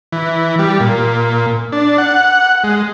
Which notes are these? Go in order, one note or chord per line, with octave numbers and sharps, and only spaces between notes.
E3
G3
A#2
D4
F#5
G#3